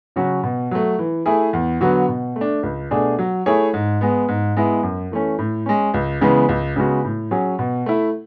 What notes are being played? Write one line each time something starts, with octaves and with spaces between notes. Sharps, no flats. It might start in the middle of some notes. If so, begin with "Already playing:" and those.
C#3 F#3 C#4 F#4
B2
F#3 A3
E3
A3 E4 G#4
E2
D3 F#3 B3 F#4
B2
A3
D4
C#2
B2 A3 D4 G#4
F#3
A3 E4 G#4 C#5
G#2
G#3 B3
G#2
G#3 B3 E4 B4
F#2
E3 A3 C#4
A2
G#3 C#4
C#2
C#3 E3 G#3 B3
C#2
C#3 G#3 B3 F#4
A2
F#3 C#4 G#4
B2
A3 E4